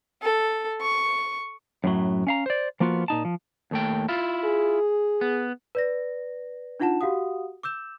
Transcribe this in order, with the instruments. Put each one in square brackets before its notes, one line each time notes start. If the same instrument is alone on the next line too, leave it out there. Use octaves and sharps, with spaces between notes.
[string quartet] A4
C#6
[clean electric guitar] F#2 A2 F#3
C#4 F5 A#5
C5 D5
F3 A#3 B3 F4 F#4
A#2 D#4 A5
F3
D#2 A3 G5
E4 F4
[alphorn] G#4
[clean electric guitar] B3
[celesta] B4 D5 A#6
D4 D#4 F4 F#5 A5 E7
F#4 G4 F5 F#5 D#6
D6 E6 G6 E7